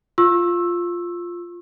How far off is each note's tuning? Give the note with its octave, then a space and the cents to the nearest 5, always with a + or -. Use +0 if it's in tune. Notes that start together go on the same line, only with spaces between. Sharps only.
F4 +0 C#6 -40 E6 +0